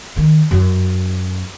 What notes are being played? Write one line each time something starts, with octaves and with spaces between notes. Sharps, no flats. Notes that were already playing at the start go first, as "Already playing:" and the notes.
D#3
F#2